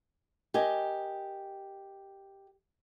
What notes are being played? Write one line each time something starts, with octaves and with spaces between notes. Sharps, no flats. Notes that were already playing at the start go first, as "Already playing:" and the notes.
G4 A#4 D#5 G#5